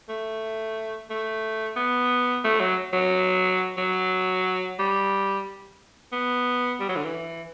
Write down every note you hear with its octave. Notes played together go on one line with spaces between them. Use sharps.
A3
A3
B3
A3
F#3
F#3
F#3
G3
B3
G3
F#3
D3
E3